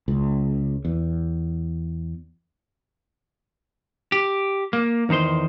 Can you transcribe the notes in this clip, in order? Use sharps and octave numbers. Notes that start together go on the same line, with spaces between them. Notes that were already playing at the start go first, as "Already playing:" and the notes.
C#2
E2
G4
A#3
E2 D#3 D#4 C5 C6